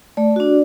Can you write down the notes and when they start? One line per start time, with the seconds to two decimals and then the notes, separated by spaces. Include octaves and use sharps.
0.17 A3 D5
0.36 D4 F#4